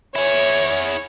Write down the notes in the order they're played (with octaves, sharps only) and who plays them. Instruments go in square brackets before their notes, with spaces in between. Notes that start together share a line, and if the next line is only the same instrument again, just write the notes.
[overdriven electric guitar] E4 G#4 [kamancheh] C#5